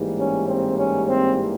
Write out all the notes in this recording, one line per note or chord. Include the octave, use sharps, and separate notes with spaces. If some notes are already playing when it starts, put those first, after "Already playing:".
Already playing: A1 G#2 E3 G3 A#3
C#4
C4
C#4
C4